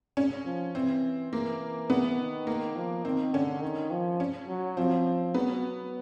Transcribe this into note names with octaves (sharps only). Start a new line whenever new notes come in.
C#4
F3
E3 C4
E3 A#3
B3
D#3
A#3
F3
D#3 C4
D3 C#4
D#3
F3
C#4
F#3
F3 C4
F#3 B3